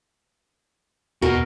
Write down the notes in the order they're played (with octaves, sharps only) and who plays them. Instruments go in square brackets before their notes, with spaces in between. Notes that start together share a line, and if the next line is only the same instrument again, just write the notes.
[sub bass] E2 [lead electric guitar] B2 [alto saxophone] F#4 [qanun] A#4